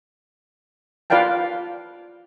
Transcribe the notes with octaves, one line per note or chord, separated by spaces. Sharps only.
F4 B4 D5 F5 G5 A5